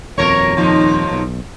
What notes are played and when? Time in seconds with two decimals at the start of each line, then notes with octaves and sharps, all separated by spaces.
0.18 D#1 F2 B2 A#4 C#5
0.57 D#2 F3 D#4
1.11 B1